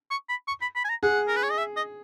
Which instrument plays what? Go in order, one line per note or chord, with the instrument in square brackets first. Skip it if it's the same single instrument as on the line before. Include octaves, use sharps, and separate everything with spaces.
[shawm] C#6
B5
C#6
B5
B5
G#5
A#5
[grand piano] G#4 [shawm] F#5
[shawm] A#4
B4
C#5
D#5
E5
D#5